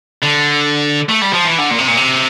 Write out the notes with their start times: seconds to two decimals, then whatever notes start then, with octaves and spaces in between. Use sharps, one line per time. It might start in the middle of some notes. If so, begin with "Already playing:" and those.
0.23 D3
1.09 A3
1.22 G3
1.33 F3
1.45 E3
1.58 D3
1.71 A#2
1.78 C3
1.88 A#2
1.97 C3